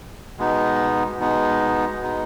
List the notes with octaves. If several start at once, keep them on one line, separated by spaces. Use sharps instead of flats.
B2 G#3 B3 D#4
B2 G#3 B3 D#4
B2 G#3 B3 D#4